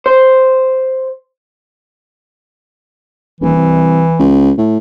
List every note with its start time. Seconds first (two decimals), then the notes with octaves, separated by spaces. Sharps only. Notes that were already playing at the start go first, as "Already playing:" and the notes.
0.06 C5
3.41 D#1 E3
3.56 C2
4.19 C#2
4.58 A2